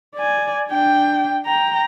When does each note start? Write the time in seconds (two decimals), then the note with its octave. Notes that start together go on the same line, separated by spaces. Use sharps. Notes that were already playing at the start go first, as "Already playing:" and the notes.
0.15 D5 G#5
0.68 D4 G5
1.46 G5 A#5